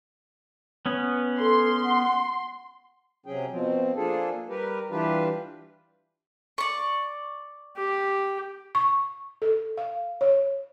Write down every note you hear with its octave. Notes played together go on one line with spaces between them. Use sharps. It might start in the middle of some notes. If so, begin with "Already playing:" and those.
B3 C#4
A4 C6
F#5
C3 F#3 C#4 G#4 G5
B2 F3 C4
F3 A#3 D4 F4 G#4 A4
G3 G4 A#4 B4
E3 G3 D4 F4 G4 B4
D5 C#6
G4
C#6
A4
F5
C#5